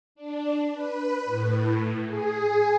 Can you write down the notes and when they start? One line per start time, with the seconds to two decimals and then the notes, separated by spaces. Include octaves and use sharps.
0.15 D4
0.72 B4
1.25 A2
2.07 G#4